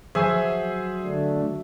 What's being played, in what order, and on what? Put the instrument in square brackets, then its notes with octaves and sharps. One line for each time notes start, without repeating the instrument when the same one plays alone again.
[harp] F#3 [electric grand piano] G#4 C5 G#5 [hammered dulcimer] E5
[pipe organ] D3 A3 D4